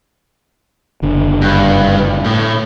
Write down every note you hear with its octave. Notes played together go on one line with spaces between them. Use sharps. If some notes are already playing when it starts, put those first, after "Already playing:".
F#1 D3
G2
A2